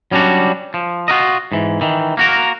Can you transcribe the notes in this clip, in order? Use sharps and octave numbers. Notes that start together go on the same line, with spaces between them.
F#3 G3 C#4 D4 F#4
F3
F4 F#4 A#4 D#5
G#2 E3
D#3 E3
A#3 F#4 A#4